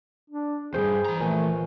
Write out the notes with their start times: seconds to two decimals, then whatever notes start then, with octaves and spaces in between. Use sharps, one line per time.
0.30 D4
0.74 E2 G2 G#4 C5 G5
1.05 E3 A#5
1.20 A#1 A3 G#5